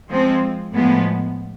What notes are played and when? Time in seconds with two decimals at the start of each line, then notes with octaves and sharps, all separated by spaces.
0.09 F3 G#3 C4
0.75 A2 F3 G#3 B3